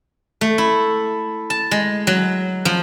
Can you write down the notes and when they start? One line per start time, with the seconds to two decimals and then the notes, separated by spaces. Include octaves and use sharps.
0.41 A3
0.58 E4
1.50 A5
1.71 G#3
2.07 F#3
2.65 F3